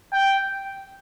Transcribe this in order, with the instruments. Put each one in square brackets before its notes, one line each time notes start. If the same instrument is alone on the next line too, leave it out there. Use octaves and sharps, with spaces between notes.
[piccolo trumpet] G5